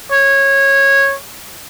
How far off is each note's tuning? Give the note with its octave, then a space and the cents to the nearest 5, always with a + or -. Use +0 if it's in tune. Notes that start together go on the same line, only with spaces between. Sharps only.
C#5 -15